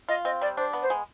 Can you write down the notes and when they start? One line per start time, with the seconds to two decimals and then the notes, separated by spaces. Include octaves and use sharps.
0.08 F4 D#5
0.25 C4 D#5
0.41 G3 D5
0.57 D4 C5
0.73 B3
0.82 C5
0.90 G#3